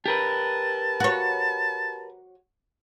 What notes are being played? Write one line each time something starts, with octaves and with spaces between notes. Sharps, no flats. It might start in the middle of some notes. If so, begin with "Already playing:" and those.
G4 A#4 B4 A5
F#4 C#5